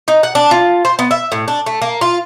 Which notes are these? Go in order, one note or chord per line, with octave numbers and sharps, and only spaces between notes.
D#4
F#5
D4
F4
C5
B3
E5
A2
D4
A3
A#3
F4